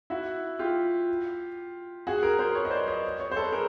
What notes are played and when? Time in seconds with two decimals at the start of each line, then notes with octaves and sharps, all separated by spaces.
0.10 E4 F#4
0.59 F4 G4
2.07 F#4 G#4
2.22 G#4 A#4
2.39 A#4 C5
2.55 B4 C#5
2.65 D#5
2.71 C5 D5
2.88 C#5 D#5
3.20 C#5 D#5
3.32 C5
3.36 A4 B4
3.52 G#4 A#4